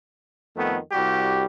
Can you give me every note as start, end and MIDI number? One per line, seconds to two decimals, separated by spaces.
0.56 0.78 41
0.56 0.78 51
0.56 0.78 57
0.56 0.78 59
0.92 1.46 36
0.92 1.46 55
0.92 1.46 66
0.92 1.46 67